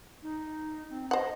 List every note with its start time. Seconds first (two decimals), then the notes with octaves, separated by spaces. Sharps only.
0.23 D#4
0.90 C4
1.11 C5 D#5 F#5